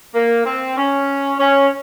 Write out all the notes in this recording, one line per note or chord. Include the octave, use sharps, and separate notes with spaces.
A#3
C4
C#4
C#4